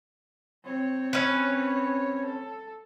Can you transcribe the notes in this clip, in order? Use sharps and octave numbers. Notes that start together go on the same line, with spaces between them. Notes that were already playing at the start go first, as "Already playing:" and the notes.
C4 C#5
C#4 B4
A4